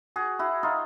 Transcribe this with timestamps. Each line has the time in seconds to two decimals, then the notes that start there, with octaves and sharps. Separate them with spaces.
0.16 F#4 G#4
0.39 E4 F#4
0.63 D#4 F4